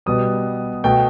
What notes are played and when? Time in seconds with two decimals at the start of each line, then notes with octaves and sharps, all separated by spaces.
0.06 B2 G3 B3 D#6
0.84 B2 A3 G5